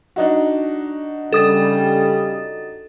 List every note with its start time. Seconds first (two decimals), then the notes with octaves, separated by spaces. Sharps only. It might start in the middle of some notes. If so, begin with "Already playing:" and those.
0.16 D4 D#4 F#4
1.33 C#3 G3 A4 D#6 A6